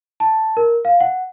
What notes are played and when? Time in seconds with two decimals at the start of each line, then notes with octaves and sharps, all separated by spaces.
0.20 A5
0.57 A#4
0.85 F5
1.01 F#5